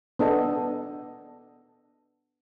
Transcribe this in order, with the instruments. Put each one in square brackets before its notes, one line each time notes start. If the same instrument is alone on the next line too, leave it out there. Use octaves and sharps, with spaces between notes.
[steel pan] B3 D4 A4 D#5